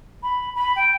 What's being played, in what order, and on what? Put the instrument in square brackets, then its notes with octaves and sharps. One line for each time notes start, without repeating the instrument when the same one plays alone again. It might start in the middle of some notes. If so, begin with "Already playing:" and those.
[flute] B5
B5
G5